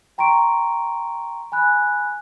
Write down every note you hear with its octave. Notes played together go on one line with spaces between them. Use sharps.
G5 A#5 C6 C#6 D7
G#5 B5 F#6